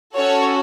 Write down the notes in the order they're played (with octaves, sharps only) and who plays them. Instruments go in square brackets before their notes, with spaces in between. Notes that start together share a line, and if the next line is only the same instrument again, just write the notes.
[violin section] C#4 F#4 A4 C#5